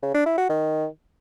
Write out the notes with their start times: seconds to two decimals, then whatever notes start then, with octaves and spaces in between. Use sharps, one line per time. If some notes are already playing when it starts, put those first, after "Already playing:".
0.02 C#3
0.14 D4
0.26 E4
0.37 F#4
0.49 D#3